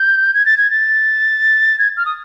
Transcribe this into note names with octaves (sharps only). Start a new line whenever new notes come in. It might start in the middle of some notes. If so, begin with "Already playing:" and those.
Already playing: G6
G#6
A6
G#6
A6
G#6
F6
D#6